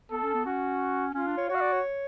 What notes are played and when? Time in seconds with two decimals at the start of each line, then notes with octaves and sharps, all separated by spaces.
0.11 B3 A4
0.23 C#4
0.34 B3
0.46 C#4 F#4
1.14 C#4 F4
1.27 D4
1.38 C#5
1.49 F#4 C#5
1.55 F5
1.61 D5
1.72 C#5